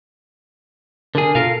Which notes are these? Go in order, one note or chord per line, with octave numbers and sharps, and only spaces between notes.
D3 G#4 A#4
B2 F4 A4 A#4 F5